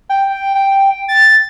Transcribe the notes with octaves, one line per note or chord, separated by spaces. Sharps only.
G5
G5
A6